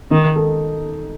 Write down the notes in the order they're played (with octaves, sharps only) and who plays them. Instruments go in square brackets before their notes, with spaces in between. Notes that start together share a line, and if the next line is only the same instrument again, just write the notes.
[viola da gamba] D#3 [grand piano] D#4
[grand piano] A4